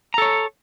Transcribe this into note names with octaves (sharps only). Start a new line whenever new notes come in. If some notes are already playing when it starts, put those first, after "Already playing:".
A4 C#5 A#5